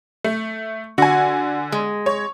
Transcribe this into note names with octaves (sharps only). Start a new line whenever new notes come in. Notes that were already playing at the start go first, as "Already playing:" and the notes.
A3
D3 F#4 G#5
G#3
C#5